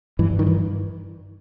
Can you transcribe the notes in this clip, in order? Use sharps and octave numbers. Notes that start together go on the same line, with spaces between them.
G2 E3
D#3
E3